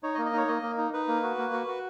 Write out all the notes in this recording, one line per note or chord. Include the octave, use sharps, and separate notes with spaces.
D#4 C#5
D#5
A#3
D#5
D#4 C#5
A#3 D#5
A#3
D#4
D#4 B4
A#3
F#4
A#3
F#4
F#4